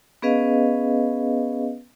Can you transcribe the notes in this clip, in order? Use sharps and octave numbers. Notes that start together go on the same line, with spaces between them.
B3 C#4 G#4 B4 D#5 F5